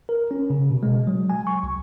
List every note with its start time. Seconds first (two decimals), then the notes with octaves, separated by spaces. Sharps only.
0.09 A#4
0.31 C#4
0.50 C#3
0.70 B2
0.83 G#3
1.07 F#3
1.30 G#5
1.47 C#6
1.63 C2